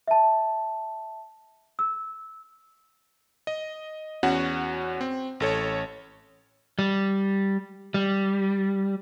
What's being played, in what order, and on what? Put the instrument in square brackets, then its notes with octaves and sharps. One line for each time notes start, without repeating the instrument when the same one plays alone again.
[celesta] E5 A5
E6
[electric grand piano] D#5
E2 C#4 F#4 F#5
C4
A1 A4 C#5
[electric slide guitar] G3
G3